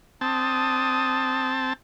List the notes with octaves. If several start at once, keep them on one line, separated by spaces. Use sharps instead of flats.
C4 D4 A5 D#6